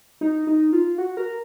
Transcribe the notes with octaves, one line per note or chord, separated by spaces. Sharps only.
D#4
D#4
F4
F#4
A#4